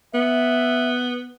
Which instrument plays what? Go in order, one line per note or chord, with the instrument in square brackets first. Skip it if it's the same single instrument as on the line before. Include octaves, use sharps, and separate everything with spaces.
[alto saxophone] B3 [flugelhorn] E5